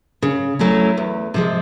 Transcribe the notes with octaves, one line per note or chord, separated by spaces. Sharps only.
C#3
F#3 A3 C#4 E4
E2
C3 F3 G#3